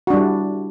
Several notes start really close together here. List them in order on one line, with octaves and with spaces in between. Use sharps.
F#4 D4 G3 E4